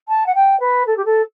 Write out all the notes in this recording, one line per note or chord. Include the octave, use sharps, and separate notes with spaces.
A5
F#5
G5
B4
A4
G4
A4